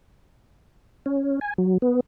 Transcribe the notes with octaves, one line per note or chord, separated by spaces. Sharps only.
C#4
G#5
F#3
B3